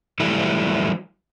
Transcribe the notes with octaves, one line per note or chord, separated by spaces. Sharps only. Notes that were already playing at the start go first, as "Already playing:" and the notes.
E3 F#3 G3 A3 E4